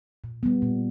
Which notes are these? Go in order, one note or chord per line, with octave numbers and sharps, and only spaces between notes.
A#2
G3 B3
A#2